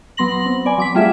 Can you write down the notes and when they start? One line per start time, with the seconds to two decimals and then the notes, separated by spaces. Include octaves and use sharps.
0.17 F#3 B3 C6 A#6 F#7
0.46 C4
0.65 B3 D5 G#5
0.78 F#3 D6 B6
0.95 G3 A3 F4 G#4 E5